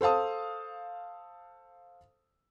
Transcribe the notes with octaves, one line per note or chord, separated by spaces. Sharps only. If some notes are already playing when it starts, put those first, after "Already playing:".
A4 C5 F5 A5 D#6